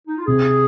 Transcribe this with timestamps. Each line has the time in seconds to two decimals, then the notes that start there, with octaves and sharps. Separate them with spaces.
0.08 D#4
0.17 F4
0.27 C3 G#4